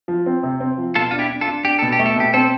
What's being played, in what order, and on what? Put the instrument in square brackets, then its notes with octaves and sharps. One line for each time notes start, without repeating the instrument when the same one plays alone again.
[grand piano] F3
C4
C3
C4
F3
[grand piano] B2 [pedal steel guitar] F4 A4
[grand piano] D4 [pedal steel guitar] F4
[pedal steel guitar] E4 G4
[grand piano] D4
[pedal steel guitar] F4 A4
[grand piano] D4
[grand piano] D4 [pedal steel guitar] G4
[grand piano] B2 [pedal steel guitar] A4
[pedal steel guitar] G4
[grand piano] A3
[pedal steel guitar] A4
[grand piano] B2 [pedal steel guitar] G4
[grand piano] C4 [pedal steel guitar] A4